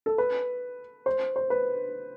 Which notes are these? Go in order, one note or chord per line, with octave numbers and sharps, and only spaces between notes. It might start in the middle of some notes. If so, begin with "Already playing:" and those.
A4
B4
C5
C5
B4